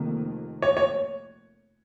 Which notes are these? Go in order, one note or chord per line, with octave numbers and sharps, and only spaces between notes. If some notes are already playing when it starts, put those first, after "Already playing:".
Already playing: F1 F2 D#3 A#3
C#5
C#5